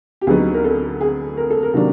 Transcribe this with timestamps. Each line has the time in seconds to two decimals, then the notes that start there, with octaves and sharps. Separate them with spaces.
0.21 G4
0.27 D2 D3 F#3 B3 D#4 G#4
0.54 A#4
0.64 A4
1.01 G#4
1.37 A#4
1.50 A4
1.63 A#4
1.74 C3 D#3 F#3 A#3 D4